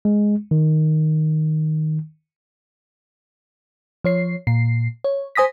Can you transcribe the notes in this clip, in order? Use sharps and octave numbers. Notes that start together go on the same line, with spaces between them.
G#3
D#3
F3 C#5 C7
A#2 C7
C#5
C5 G#5 D#6 A#6 B6